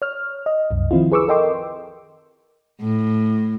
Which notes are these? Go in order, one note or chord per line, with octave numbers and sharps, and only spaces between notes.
C#5 F6
D#5
C2 F#2
D#3 F3 C4 E4 F4
G#4 B4 C#6 D6 E6
A4 A#4 D#5 G5 C6 D6
A2